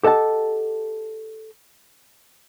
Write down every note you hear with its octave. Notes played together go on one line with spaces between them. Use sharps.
G4 A4 D#5 F#5 A5